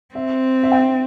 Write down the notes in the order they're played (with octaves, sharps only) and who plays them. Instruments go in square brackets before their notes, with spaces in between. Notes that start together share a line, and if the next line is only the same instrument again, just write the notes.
[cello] C4 [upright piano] E5
[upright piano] E5
G5